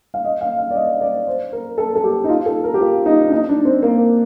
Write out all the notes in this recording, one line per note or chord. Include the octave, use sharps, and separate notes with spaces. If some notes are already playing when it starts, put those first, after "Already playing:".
F5
D#5
F5
F5
D5
D#5
D5
C5
A#4
A4
A4
G4
D#4
F4
A4
A#4
G4
F4
D#4
D4
D#4
D4
C4
A#3